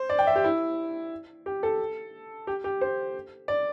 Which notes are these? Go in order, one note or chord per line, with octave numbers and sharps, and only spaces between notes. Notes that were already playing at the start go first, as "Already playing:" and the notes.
Already playing: C5
D5
G5
E5
G4
E4
G4
A4
G4
G4
C5
D5